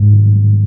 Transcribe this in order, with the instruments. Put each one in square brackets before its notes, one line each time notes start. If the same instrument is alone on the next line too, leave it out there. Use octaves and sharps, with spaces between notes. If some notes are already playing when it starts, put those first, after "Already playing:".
Already playing: [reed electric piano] G#2